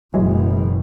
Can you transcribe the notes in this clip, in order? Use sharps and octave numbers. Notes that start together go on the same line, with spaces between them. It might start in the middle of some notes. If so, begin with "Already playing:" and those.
F#1 B2 E3 F#3 G#3